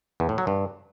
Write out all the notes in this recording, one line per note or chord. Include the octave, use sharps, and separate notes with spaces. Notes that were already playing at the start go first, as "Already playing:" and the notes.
E2
A2
F#3
G2